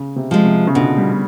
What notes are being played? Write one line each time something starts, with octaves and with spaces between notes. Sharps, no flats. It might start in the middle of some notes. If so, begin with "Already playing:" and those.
Already playing: C#3
C3
F3 G#3
C3
C#3
B2 D3
G3